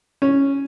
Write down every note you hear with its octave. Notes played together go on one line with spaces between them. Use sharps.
C#4